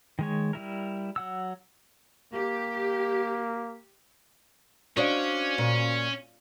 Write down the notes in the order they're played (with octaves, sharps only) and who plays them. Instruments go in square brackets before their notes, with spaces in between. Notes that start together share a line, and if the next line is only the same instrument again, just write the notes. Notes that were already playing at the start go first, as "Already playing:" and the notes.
[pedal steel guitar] D#3 G#3 C#5
G3 E4 A#4
F#3 F#5 E6
[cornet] A#3 [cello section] G4
[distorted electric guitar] C#4 [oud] D4 D#5 [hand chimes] F#4 C5 F5
[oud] A#2